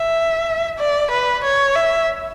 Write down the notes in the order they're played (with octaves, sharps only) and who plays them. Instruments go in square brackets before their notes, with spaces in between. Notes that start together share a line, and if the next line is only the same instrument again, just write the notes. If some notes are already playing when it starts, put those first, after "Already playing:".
Already playing: [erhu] E5
D5
B4
C#5
E5